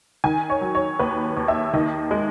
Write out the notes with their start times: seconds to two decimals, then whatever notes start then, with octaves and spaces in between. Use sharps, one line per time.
0.24 D#3 G#5
0.50 C#5
0.61 F#3
0.75 C#5
0.99 D#2 B4
1.37 D#2
1.48 E5
1.73 D#3 D#5
2.11 G#3